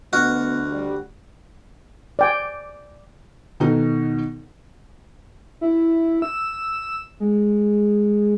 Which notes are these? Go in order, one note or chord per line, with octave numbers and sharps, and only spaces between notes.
D2 B3 F#4 D#5 F6
G3
D5 G5 G#5
B2 D#3 B3 D#4 A4
E4
E6
G#3